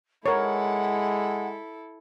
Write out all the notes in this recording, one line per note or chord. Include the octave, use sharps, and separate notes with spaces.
G#3 E4 A4 A#4 C#5 F#5